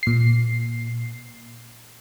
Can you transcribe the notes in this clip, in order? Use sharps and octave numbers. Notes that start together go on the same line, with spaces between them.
A#2 C7